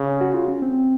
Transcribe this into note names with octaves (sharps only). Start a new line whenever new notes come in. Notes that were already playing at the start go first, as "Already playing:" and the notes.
Already playing: C#3
F#4
F4
C#4
C4